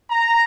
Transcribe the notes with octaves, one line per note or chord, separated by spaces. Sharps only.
A#5